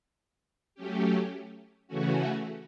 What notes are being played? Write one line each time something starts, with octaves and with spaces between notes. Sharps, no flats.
F#3 A3 C#4 G4
C#3 E3 A3 C#4 F#4